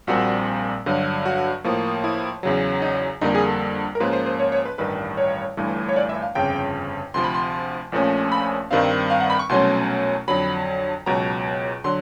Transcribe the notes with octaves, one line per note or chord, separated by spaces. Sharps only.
A#1 A#2 G3 C4 F#4
G2 D3 F#3 F#4
F#4
A2 F3 A#3
E4
E2 C#3 F#3
D#4
F2 D3 G3 A#3 D#4
G#4
A4
A#4
G#2 F3 A#3 C#4 B4
C5
C5
C#5
C#5
B4
A1 G2 D#3 G3 B4
C#5
G1 G2 E3 A3
C#5
D5
E5
F5
G1 F2 C#3 G5
D2 C3 F3 C6
B5
C6
A#1 A#2 F3 A3 C#4
B5
G2 D#3 G3 C4 F5
F5
F#5
B5
C#6
C2 B2 F#3 A3 C#4 C6
F2 D3 F#3 B5
C#2 B2 F#3 A#5
D3 F#3 C6